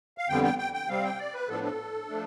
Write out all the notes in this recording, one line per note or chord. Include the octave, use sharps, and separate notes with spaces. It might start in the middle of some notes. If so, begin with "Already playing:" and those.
F5
F2 D3 G3 B3 G5
G5
G5
G5
C3 G3 C4 F5
G5
D5
B4
A2 F3 B3 D4 A4
A4
F3 A3 D4